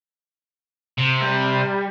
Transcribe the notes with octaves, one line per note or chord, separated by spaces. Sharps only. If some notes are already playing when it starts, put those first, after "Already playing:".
C3
G3